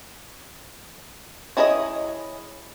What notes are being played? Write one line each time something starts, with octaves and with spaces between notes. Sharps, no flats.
C#4 E4 G#4 A#4 D#5